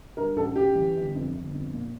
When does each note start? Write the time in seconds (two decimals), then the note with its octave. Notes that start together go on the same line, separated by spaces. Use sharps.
0.17 G2 A#4
0.36 A1 A4
0.56 A1 G4
0.75 E3
0.96 G1
1.15 F2
1.34 G1
1.54 F2
1.73 A#2